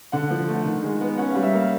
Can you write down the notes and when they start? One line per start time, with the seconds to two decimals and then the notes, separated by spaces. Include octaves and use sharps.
0.12 D3 F#5
0.30 F3
0.48 A3
0.65 D#3
0.83 G#3
1.01 B3
1.17 C#4 F#5
1.30 G3 F5
1.43 E5
1.53 A#3 F5